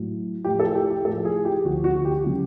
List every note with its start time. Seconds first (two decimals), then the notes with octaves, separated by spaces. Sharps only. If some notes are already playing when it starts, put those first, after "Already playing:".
Already playing: A2 F#3
0.45 A2 F3 G4
0.59 A4
0.75 G4
0.90 G4
1.04 A2 A4
1.08 F3
1.25 G#4
1.45 G4
1.64 D2 D3 F3 F#4
1.84 F#4
2.05 G4
2.24 C#3 F#3 G4